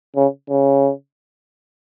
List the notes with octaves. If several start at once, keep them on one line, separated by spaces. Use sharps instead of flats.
C#3
C#3